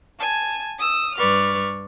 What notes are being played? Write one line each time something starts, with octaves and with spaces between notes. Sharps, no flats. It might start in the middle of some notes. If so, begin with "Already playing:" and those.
G#5 A5
D#6 E6
G2 B4 D5 C#6 F6